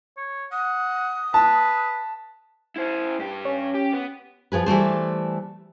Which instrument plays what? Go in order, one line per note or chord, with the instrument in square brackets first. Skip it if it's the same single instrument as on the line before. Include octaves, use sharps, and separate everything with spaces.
[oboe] C#5
[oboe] F#5 [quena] D#6
[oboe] B4 [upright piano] A5
[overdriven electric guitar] E4 C5
G2 G4
[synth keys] C#4
[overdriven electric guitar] G4
B3
[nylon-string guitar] F3 F#3 G#4 B4
E3 G3 A3 C5